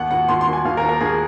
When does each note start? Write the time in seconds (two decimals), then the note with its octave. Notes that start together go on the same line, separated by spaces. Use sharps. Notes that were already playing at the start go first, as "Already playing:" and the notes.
Already playing: D#2 F#5
0.11 D#2 F#5
0.28 D#2 C6
0.41 C6
0.47 D#2
0.53 G#5
0.65 D#2 F5
0.77 A#4
0.83 D#2
0.89 A#4
1.01 D#2 G#4